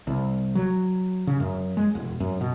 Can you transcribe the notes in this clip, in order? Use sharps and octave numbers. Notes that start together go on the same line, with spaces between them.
C2
F#3
C#3
F#2
G#3
E1
F#2
B2